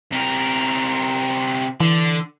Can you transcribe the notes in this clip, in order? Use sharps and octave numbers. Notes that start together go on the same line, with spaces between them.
C3 A#4
D3 E3